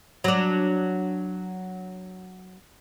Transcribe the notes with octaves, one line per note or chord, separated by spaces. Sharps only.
F#3 D4